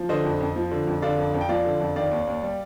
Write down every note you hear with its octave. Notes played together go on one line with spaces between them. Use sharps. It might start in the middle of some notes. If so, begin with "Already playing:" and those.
Already playing: F3
D3 C5 D#5
F2
F2
F3
D3
F2
D3 D5 F5
F2
F2
G5
F3 D5 F5
D3
F2
D#3 D5 F5
D#2
D#2
G3